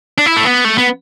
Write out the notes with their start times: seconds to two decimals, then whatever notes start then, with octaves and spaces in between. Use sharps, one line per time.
0.18 D4
0.26 E4
0.36 A3
0.45 B3
0.65 A3
0.78 B3